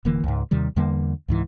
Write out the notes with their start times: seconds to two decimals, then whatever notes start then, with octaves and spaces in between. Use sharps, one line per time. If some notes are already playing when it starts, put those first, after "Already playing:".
0.05 D#1 D3 E3 A#3
0.24 C#2 G#2
0.51 D#2 C3 D#3 G3
0.76 E2 D3 G3 A#3
1.28 C#2 G#2 E3